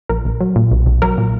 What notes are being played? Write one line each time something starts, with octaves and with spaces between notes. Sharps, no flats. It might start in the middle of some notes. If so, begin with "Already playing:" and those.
A#1 A#4
A#1
F#3
A#2
B1
B1
F#3 A#4
A#2